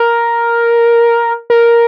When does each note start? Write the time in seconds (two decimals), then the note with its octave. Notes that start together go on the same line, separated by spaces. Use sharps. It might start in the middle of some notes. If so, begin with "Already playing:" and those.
Already playing: A#4
1.50 A#4